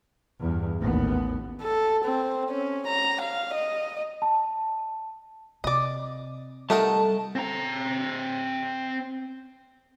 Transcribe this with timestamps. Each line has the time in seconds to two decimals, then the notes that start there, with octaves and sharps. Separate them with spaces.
0.40 E2 G2
0.78 A1 D#2 B3
1.62 A4
2.05 C4
2.50 C#4
2.88 A#5
3.22 F5
3.54 D#5
4.22 A5
5.64 C3 D5 D#5
6.70 G3 A3 D#4 A4 A#4 F#5 A5
7.36 C4 A#5